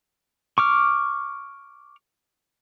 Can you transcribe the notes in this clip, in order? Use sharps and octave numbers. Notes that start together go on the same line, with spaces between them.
C#6 D6 F6